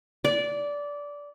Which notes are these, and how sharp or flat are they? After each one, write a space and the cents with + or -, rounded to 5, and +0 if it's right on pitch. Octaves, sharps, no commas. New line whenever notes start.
D5 -15